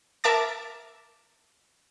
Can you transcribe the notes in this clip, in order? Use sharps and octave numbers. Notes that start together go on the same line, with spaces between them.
A#4 E5 A5 A#5 D6 A6